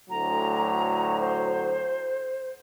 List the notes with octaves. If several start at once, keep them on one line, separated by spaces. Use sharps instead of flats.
D2 A2 F#3 A#5
C5